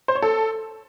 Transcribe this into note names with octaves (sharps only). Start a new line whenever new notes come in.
C5
C#5
A4